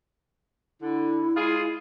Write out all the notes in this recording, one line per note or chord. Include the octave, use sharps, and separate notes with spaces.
D3 E4
G#3 F4 G#4